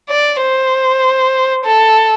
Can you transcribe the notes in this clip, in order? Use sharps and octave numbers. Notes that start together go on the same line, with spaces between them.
D5
C5
A4